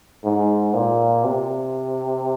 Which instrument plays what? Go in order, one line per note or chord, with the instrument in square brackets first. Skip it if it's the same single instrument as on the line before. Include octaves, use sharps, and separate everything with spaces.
[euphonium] G#2
A#2
C3